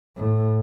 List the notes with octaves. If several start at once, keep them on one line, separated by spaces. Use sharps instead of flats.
A2